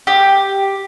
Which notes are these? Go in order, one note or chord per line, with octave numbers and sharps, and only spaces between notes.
G4